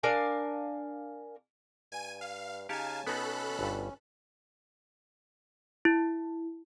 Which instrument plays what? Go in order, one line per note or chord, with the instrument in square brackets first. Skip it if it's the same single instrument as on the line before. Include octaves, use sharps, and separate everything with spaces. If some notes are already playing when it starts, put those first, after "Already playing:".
[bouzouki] D4 A#4 F5 G#5
[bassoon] G2 [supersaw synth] G#5 D#7
[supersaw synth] F5
[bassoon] C#3 [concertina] D#4 F5 [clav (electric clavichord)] G4 C#5 [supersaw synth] G#5 A5
[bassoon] B2 [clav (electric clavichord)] B3 D#4 [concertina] C#4 [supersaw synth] A4 B5 F#6
[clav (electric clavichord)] G1 G2
[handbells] E4